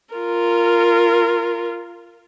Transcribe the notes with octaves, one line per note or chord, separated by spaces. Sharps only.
F4 A#4